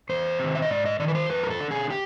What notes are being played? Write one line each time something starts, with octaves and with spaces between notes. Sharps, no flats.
E2 C5
C3 D#3
E5
D#5
G#2 D5
D#5
D#3 D5
B4
C5
F2 B4
A#4
A4
D3
G#4
G4